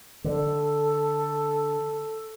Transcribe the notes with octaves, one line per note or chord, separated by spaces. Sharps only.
D3 A4